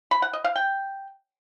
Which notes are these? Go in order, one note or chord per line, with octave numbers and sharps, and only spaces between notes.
B5
F#5
D#5
F5
G5